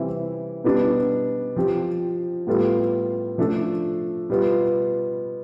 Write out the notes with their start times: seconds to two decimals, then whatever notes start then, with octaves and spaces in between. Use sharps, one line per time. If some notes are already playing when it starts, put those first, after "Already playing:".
Already playing: C3 E3 G3 C4 E4
0.64 B2 G3 B3 D4
1.56 F3 C4 G4
2.47 A2 G3 B3 F4 A4
3.38 F3 A3 D4 A4
4.30 B2 G3 B3 F4